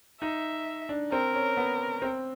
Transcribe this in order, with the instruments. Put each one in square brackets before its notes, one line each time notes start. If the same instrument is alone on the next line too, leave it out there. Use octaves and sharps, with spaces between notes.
[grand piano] D#4 [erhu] E5
[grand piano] D4
[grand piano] C4 [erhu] A#4
[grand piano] C#4
B3
C4